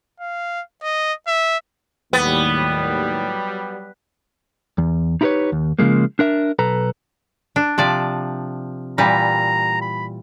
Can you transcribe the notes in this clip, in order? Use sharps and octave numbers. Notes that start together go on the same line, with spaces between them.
F5
D#5
E5
D#2 A2 F#3 G3 B3
E2
D#4 E4 G4 A#4 B4 C#5
D#2
C#3 F3 G#3 A#3
D4 A#4 E5
B1 A4 B4 A#5
D4
C3 F3 D5
A#2 E3 G3 A#5
B5